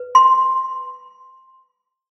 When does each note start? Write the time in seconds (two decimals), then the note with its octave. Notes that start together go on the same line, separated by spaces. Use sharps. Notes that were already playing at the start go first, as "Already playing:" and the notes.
Already playing: B4
0.15 C6